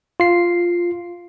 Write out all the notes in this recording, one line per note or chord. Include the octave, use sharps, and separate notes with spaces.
F4 C7